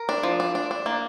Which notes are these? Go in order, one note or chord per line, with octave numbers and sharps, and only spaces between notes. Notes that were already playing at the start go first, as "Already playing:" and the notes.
Already playing: A#4
D4
F3
D4
D4
D4
A#3